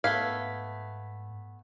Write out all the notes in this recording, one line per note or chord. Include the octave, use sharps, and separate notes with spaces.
G#2 A3 B3 F5 G#6 B6